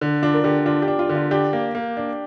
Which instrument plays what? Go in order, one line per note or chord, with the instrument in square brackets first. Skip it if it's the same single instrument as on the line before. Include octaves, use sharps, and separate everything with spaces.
[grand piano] D3
[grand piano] D4 [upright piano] F4
[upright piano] A#4
[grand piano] D3 [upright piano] G4
[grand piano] D4 [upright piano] F4
[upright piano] G4
[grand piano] D4
[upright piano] F4
[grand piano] D3
[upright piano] F4
[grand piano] D4 [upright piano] G4
[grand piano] A#3
A#3
D4